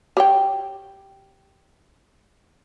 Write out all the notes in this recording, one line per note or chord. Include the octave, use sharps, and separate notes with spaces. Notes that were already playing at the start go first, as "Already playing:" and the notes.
G4 C#5 G5